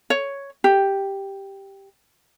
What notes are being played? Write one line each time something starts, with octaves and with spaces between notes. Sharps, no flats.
C#5
G4